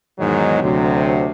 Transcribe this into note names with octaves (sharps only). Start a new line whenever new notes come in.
E2 G#2 D#3 F#3 G#3 D#4
D2 C3 F#3